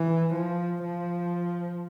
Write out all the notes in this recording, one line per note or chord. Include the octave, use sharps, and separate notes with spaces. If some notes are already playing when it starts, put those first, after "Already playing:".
Already playing: E3
F3
F3